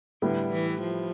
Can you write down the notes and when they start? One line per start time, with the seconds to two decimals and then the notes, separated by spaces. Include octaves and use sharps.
0.22 A2 D3 G3 B3 E4
0.52 E3
0.81 F3